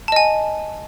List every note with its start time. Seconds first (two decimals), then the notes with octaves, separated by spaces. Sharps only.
0.08 A5
0.12 D#5
0.16 G#5